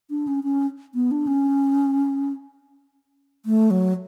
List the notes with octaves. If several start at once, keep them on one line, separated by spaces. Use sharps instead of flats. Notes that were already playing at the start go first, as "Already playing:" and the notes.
D4
C#4
C#4
B3
D4
C#4
A3
F#3